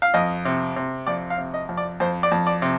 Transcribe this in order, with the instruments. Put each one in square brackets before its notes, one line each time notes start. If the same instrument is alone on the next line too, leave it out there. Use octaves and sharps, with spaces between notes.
[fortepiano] F5
F2 D#5
C3
C3
F2 D5
F5
C3
D#5
F2
D5
F2 C5
D5
F2
D5
C3